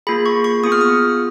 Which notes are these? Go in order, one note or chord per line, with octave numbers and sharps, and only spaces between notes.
A#3 F4 G#4 B5
C#6
C#6
B3 F4 G#4 D#6
F6
D#6